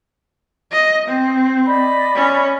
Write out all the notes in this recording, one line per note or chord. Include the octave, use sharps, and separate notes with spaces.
D#5
C4
D5 D#5 B5
C#4